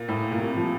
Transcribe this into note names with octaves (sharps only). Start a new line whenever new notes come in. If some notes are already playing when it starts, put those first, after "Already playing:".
Already playing: A#2
A2
A#2
C3
F3